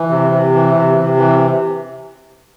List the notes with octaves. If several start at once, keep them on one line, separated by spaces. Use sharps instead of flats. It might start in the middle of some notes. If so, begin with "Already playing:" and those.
Already playing: E3
C3
C3
E3
C3
C3
E3